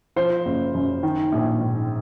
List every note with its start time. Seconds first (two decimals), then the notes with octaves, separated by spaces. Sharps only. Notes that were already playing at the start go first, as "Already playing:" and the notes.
0.16 F3 C5
0.45 F#1
0.74 F#2
1.03 D#3
1.32 A#1
1.61 G#2